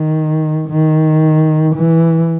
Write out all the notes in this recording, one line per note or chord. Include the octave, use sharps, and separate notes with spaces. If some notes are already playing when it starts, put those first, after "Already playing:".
Already playing: D#3
D#3
E3